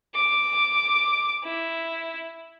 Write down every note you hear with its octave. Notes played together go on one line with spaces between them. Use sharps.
D6
E4